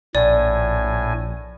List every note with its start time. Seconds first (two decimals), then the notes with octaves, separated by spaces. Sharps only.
0.15 A#1 A2 D5 G#5